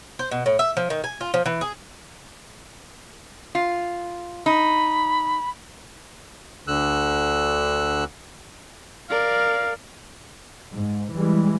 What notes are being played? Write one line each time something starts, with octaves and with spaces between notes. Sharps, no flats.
C5
B2
A2
E5
F3
D#3
G#5
F4
F3
E3
G#4
F4
D#4 B5
D2 D3 E6 F#6
A#4 D5 F5
G#2
E3 G3 G#3